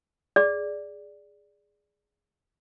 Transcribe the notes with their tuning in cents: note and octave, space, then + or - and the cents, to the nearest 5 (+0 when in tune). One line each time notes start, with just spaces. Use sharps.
G#4 +0 D5 +0